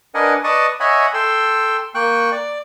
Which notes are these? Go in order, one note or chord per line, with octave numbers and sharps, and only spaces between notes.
D4 A#4 B4 D#5 F#5 G#5
B4 D5 D#5 A5 C#6 D#6
C#5 D#5 E5 F#5 G#5 B5
A4 G5 C6 E6
A#3 G5 C#6 F#6
D5